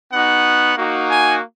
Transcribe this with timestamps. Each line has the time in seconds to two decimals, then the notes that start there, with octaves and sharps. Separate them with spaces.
0.12 B3 D#4 F#4 F#5
0.76 A#3 D#4 F#4
1.09 G#5